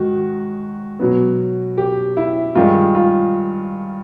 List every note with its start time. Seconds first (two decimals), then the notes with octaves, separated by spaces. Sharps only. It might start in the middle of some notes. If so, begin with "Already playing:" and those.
Already playing: G#2 D#3 F#4
1.00 B2 F#3 B3
1.78 G4
2.17 E4
2.55 G2 D#3 G#3 F4
2.95 F4